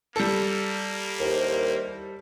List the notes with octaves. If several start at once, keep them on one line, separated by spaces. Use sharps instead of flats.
G3 A#3 A4
D#2 E4 A#4 C5